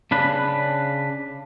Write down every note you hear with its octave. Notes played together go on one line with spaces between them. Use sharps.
C#3 D4 B4